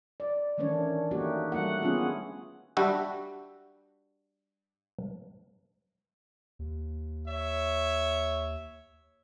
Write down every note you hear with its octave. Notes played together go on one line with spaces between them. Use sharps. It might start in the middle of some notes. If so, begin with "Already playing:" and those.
D5
D#3 E3 A3 C#4 D4 C#5
A3 A#3 D#4 F#4 G4
G3 A3 F#4 F#5
B3 C#4 D4 F4 G#4
G3 D4 F#4 G4 E5
D#2
C#5 E5